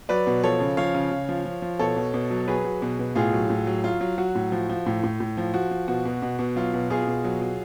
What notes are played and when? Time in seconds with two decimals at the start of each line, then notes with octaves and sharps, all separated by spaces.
0.09 F#3 B4 D5
0.27 B2
0.44 F3 A4 C#5
0.60 C#3
0.77 F3 C#5 F5
0.95 C#3
1.11 C#3
1.29 F3
1.45 F3
1.62 F3
1.79 B2 A4 C#5
1.96 B2
2.14 B2
2.30 F#3
2.48 F#3 G#4 B4
2.65 F#3
2.82 B2
2.99 B2
3.15 A2 F4 G#4
3.33 F#3
3.50 A2
3.67 F#3
3.84 F#3 F4
4.01 F#3
4.18 F#3 F#4
4.35 A2
4.52 F3
4.69 F3
4.86 A2
5.03 A2
5.20 A2
5.37 F3
5.54 F3 F#4
5.71 F3
5.88 B2 F#4
6.05 B2
6.22 B2
6.39 B2
6.56 F#3 F4
6.74 B2
6.90 B2 F4 G#4
7.07 B2
7.24 F#3
7.42 F#3